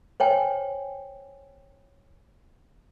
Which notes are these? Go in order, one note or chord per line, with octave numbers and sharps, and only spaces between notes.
C5 C#5 G5 G#5